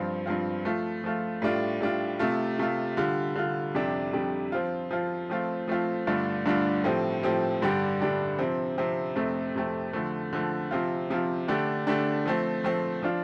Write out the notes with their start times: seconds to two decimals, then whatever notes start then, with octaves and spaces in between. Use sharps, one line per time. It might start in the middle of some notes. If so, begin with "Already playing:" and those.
Already playing: G2 F3 C4 F4
0.26 G2 F3 C4 F4
0.65 F3 A3 F4
1.04 F3 A3 F4
1.42 A2 G3 D4 F4
1.81 A2 G3 D4 F4
2.19 C3 A3 F4
2.59 C3 A3 F4
2.97 D3 G3 F4
3.35 D3 G3 F4
3.75 F2 C3 G3 D4 G4
4.13 F2 C3 G3 D4 G4
4.52 F3 C4 F4
4.91 F3 C4 F4
5.30 F3 A3 C4 F4
5.68 F3 A3 C4 F4
6.07 G2 D3 A3 D4 F4
6.45 G2 D3 A3 D4 F4
6.84 A2 F3 C4 G4
7.23 A2 F3 C4 G4
7.62 G2 D3 G3 D4 G4
8.00 G2 D3 G3 D4 G4
8.39 C3 F3 C4
8.78 C3 F3 C4
9.16 F2 C3 A3 C4
9.55 F2 C3 A3 C4
9.93 D3 F3 A3
10.33 D3 F3 A3
10.71 C3 F3 C4 F4
11.10 C3 F3 C4 F4
11.48 D3 A3 D4 G4
11.87 D3 A3 D4 G4
12.26 F3 A3 C4
12.64 F3 A3 C4
13.02 F3 D4 F4